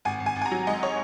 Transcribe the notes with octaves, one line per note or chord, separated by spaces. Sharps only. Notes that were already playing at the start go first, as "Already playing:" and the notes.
G#1 G#5
G#1
G#5
G#1
G#5
A#5
F#3
G#2 D#5
C#5